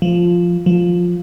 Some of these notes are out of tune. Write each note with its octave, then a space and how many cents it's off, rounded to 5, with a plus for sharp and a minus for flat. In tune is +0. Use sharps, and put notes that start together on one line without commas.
F3 +0
F3 +10